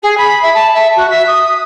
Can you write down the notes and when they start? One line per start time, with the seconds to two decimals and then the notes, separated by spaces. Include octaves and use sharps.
0.02 G#4
0.17 B5
0.42 E5
0.54 A5
0.74 E5
0.96 F#4
1.10 E5
1.27 D#6